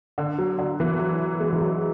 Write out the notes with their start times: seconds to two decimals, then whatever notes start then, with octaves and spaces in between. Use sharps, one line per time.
0.18 D3
0.38 F#3
0.59 D3
0.80 E3
0.99 F#3
1.40 G#3
1.53 E3
1.61 F#3